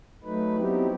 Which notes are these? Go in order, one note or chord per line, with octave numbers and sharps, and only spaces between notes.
F#3 A3 D#4 B4
F#3 B3 C4 D#4 E4 G4